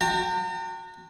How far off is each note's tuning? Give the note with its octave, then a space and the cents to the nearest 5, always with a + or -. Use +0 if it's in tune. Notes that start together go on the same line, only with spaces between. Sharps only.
F#4 -20 G5 +5 A#5 -40